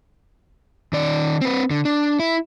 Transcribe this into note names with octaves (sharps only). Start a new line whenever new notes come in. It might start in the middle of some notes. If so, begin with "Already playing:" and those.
D#3 D5
C4 B4
D3
D4
E4